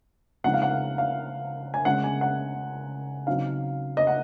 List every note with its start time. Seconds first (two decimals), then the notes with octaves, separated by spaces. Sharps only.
0.44 C#3 F3 G#3 C4 D#4 F#5
0.54 F5
0.62 F#5
0.71 F5
0.98 F5
1.74 G#5
1.85 C#3 G#3 C#4 F#5
2.04 G#5
2.21 F#5
3.27 C#3 F#3 C4 D#4 F5
3.97 D#5
4.07 F#5